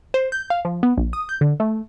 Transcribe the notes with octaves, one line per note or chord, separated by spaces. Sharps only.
C5
G6
F5
F3
B3
A#1
D#6
G6
D3
A3